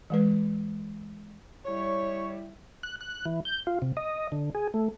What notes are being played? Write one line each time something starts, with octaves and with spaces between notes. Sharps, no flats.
E3 G#3 B4
G3 E4 C#5
F#6
F#6
E3
G6
F4
C3
D#5
D3
G#4
A3